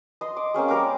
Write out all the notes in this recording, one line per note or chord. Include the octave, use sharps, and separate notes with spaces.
D#5 C6
D6
A#3 C4 C#4 G#4
G3 A#4 G5 D6